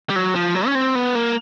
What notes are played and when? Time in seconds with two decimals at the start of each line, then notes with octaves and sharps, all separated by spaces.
0.10 G3
0.16 F#3
0.35 F3
0.55 F#3
0.67 C#4
0.75 C4
0.95 B3
1.15 A#3